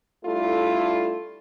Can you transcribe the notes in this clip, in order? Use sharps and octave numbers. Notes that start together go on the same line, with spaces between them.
G3 A3 D4 E4 F4 A4